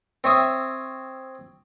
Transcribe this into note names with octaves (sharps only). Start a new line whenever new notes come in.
C4 C#5 E5 D#6